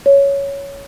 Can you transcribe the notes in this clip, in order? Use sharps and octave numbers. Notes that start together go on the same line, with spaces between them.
C#5